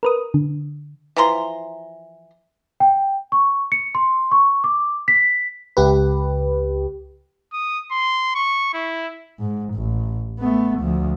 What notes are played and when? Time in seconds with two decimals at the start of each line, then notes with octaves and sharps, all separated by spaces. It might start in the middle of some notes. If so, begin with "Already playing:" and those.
0.03 A#4 B4 D#6
0.34 D3
1.16 E3 F3 A#5 C6
2.80 G5
3.32 C#6
3.72 C#7
3.95 C6
4.31 C#6
4.64 D6
5.08 B6
5.77 C#2 G4 B4
7.53 D#6
7.91 C6
8.35 C#6
8.74 E4
9.40 G#2
9.75 A1
10.39 A3 B3
10.79 D2 F3